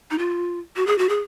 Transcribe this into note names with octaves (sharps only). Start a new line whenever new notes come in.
D#4
F4
F#4
G#4
F#4
G#4